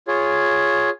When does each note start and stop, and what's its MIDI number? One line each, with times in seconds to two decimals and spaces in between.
0.08 0.90 65
0.08 0.90 68
0.08 0.90 73